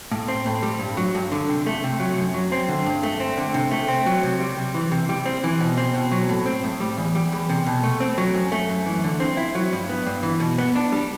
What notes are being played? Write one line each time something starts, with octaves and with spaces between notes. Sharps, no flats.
A2
C4
A2
G3
G2
F#3
G2
D3
C3
A3
C3
F#3
F#2
F#3
C4
D3
G2
A3
C4
D3
C3
A3
C4
F#3
C3
G3
C3
E3
C3
G3
C4
E3
B2
C4
B2
F#3
A2
C4
A2
G3
E2
G3
E2
C3
B2
A3
C4
F#3
F#2
A3
F#2
E3
D3
C4
E4
F#3
G2
B3
G2
E3
B2
B3
D4
G3